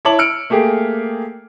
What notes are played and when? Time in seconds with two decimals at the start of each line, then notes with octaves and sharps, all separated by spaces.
0.05 E4 C#5 A5 D6 F#7
0.19 E6 F6 C#7 D7
0.50 A3 A#3 G4 G#4